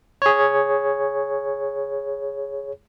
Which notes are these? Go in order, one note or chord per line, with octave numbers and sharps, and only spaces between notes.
G#4 C#5